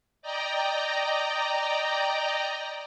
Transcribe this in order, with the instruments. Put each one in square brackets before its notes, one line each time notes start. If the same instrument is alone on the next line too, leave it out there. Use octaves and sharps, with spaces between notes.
[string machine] D5 D#5 G5 A#5